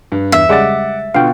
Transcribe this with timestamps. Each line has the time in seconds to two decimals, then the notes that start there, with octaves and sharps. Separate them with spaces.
0.12 G2
0.32 E2 E5
0.49 C#3 G3 G#3 F#5 D6 A6
1.14 B2 D3 F4 F5 G5